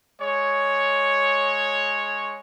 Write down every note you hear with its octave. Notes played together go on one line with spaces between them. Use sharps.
G#3 C#5